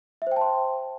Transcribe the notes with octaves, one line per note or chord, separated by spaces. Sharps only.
C5 E5 G5 A5 C6